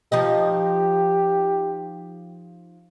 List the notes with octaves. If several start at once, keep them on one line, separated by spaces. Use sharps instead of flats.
F3 D#4 G4 D#5